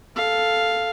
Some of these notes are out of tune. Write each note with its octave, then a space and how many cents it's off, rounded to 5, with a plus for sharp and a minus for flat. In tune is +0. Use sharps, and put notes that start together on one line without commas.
A4 +0 F5 +0